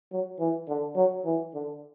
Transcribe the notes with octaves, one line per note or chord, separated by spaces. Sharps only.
F#3
E3
D3
F#3
E3
D3